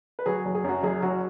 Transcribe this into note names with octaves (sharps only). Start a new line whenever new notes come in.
B4
F#3 G#4
F#1
G#4
F#2 F#4
F#1 G#4
F#3 F#4